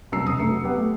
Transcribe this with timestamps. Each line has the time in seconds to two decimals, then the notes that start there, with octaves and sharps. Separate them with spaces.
0.12 C2 F#3 A#5 E6 C7
0.24 E1 A#5 D#6
0.37 F1 G2 A3 C#7
0.51 F#3
0.64 B3 G4 F#5
0.76 A3